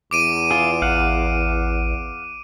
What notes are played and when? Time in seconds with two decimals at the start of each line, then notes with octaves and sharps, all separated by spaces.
0.11 E2 D6 D7 D#7
0.51 F4 G#4
0.82 A1 F5 F#5